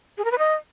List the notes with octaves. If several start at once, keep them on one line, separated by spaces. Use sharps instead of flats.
G#4
A#4
B4
D#5